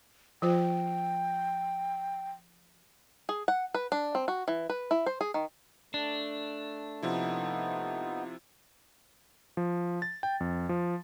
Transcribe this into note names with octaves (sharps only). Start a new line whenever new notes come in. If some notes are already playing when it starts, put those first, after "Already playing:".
F3 F4 C5 G5
G#4
F#5
B4
D4
C4
F#4
E3
B4
E4
C5
G#4
D#3
A3 D4
C3 F3 B3 D#4 E4
F3
A6
G5
F2
F3